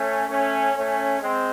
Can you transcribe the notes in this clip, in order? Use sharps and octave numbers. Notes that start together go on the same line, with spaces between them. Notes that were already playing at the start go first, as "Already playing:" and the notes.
Already playing: A3 C#4
A3 C#4
A3 C#4
G#3 C4